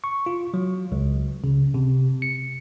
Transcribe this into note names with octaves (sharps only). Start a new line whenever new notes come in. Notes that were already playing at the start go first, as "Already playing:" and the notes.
C#6
F4
F#3
C#2
C#3
C3
C#7